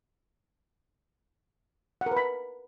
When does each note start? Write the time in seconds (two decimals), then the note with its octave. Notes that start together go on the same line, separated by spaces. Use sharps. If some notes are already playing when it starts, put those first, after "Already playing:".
2.01 F#5
2.06 A#4
2.11 B4
2.17 B5